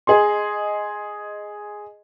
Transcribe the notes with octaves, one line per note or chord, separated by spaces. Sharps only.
G#4 D#5 C6